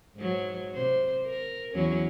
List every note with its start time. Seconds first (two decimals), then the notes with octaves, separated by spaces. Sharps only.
0.16 G#2 F#3
0.74 C3 C5
1.26 A#4
1.75 E2 F#3 C#4